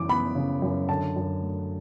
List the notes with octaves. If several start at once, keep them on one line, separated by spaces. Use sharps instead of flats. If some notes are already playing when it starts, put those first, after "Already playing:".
Already playing: F#2 C#3 E3 D6
B3 B5
C#3
F#2
D3 A5
F#2
A3